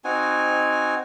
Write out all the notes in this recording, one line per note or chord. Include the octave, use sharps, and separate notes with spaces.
C4 D#4 F#4 G#5